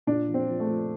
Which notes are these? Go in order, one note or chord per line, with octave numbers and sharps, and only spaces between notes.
A#2 D4
F3
C4
F3
A3
F3